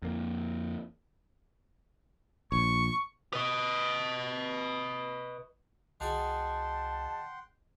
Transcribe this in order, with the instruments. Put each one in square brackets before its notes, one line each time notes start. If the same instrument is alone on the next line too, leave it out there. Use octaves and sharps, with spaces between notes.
[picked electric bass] F2 A#3
[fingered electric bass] A#1 [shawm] C#6
[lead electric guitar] B4 D#5
[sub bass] C2 [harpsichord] D#3 F#4 G#4 [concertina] F#5 G5 C6 [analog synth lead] A5